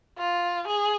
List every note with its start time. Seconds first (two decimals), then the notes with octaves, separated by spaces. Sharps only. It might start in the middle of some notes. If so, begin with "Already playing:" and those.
0.18 F4
0.68 G#4